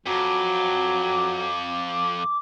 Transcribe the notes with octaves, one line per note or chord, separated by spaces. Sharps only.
F2 F#3 D6